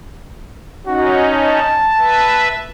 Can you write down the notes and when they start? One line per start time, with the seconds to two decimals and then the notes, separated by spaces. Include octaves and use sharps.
0.87 C#4 D#4 F#4
1.32 A5
1.98 B4 E5